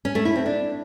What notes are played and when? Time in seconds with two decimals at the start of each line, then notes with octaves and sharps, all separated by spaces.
0.05 C#4
0.15 A3
0.25 E4
0.36 C4
0.46 D4